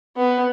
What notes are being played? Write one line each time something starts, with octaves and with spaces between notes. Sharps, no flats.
B3